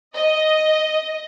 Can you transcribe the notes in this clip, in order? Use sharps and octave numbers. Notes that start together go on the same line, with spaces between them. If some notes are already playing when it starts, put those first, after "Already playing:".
D#5